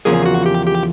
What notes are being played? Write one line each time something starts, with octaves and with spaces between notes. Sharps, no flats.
E2 C#3 F3 A#3 G#4
F#4
G4
G4